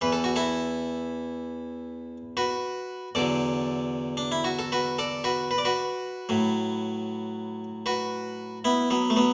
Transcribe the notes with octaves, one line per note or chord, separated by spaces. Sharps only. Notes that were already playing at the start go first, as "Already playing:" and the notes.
E2 E3 B4
A4
F#4
E4 A4
F#4 B4
E2 D3 F#3 A4 D5
D4
E4
F#4
A4
F#4 B4
A4 D5
F#4 B4
B4
D5
F#4 B4
A2 F#3
F#4 B4
B3 E4
F#3 B3
A3
F#3 B3